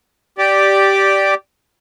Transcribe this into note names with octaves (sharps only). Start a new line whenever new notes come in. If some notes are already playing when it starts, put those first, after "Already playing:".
G4 D5